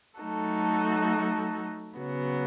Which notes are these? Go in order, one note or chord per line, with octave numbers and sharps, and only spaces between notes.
F#3 A3 D#4 F#4 A4
C#3 F#3 B3 F#4